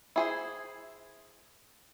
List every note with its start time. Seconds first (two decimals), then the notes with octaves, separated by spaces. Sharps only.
0.16 E4 G#4 C5